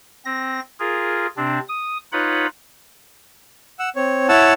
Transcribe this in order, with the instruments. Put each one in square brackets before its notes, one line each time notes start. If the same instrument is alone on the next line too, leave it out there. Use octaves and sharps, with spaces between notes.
[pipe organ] C4 A#6
F4 G#4 A#4
C3 C4 D4
D#6
D#4 F4 B4 C#5 F#5 B5
[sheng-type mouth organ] F#5 E6
C4 C#5
E4 C#5 F#5 A5 E6